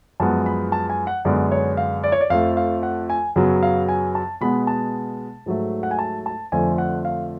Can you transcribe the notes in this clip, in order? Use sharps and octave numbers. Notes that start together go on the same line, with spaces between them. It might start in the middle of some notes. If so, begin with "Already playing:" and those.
F#2 F3 G#3 B3 A5
B5
A5
G#5
F#5
F#2 D3 G#3 B3 D5
C#5
F5
D5
C#5
D5
F2 F3 A3 F5
F5
F#5
G#5
F#2 C#3 F#3 B3
F5
G#5
A5
B2 G#3 B3 B5
A5
G#2 F#3 A3
F#5
G#5
A5
A5
F2 D3 F3 A3 G#5
F#5
F5